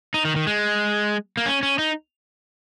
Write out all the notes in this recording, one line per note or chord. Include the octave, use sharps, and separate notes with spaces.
D#4
D#3
D#3
G#3
A#3
C#4
C#4
D#4